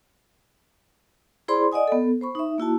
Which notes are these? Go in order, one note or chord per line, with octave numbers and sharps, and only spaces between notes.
E4 G#4 C5 D5 B5 C6
D5 D#5 F#5 G#5 D#6
B3 A4
C5 B5 C#6
D#4 E5
A#3 E4 F#4 A5